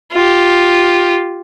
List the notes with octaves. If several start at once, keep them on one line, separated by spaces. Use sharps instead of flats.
F4 G4